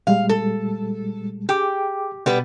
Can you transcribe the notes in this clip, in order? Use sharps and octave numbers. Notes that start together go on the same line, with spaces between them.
A#2 G3 G#3 F5
A4
G4 G#4 G5 D6
B2 G3 B3 B4